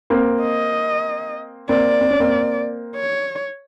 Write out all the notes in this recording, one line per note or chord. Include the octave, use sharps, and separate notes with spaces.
A#3 C4
D#5
A#3 C4 D5
C4
C#4
A#3 C4
C#5